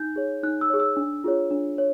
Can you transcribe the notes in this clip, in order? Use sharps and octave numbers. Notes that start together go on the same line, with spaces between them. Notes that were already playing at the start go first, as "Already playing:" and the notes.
Already playing: D#4 G6
G#4 C#5
D#4 F#6
E6
G#4 C#5
E6
D4
F4 G#4 C#5
D4
C#5